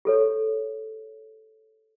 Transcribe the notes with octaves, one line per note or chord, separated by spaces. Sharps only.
G4 A4 C#5